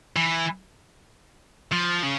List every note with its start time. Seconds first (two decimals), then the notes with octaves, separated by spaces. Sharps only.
0.16 E3
1.72 F3
2.03 C#3